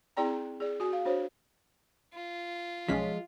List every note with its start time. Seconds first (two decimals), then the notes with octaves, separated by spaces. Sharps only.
0.17 C4 E4 G#4 D5 G5 A#5
0.60 G#4 D5
0.80 F#4 G#5
0.93 F5
1.05 D4 F#4 C5 C#5
2.14 F4
2.88 B1 F3 G#3 C#4 B6